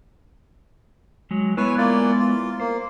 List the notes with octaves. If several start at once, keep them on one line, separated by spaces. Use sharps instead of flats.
F#3 G#3
G#3 B3 E4 B4 C#5 G#5
A#3 F4 D5
F4
A#3 C5